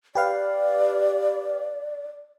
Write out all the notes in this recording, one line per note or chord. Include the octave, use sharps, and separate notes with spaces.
G4 B4 D5 F5